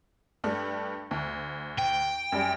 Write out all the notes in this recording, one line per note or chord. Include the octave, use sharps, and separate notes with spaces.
G2 A3 D4
D2
G5
F#2 G3